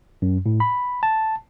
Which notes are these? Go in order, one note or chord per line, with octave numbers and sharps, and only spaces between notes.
F#2
A2
B5
A5